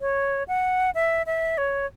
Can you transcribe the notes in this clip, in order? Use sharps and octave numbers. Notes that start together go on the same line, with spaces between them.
C#5
F#5
E5
E5
C#5